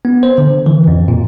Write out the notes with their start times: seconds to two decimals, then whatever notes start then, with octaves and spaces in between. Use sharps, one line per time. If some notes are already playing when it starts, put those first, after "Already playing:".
0.05 B3
0.23 C5
0.38 D3
0.66 E3
0.88 F2
1.08 A#2